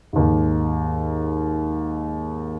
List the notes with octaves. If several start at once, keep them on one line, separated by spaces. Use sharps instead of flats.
D#2 G#2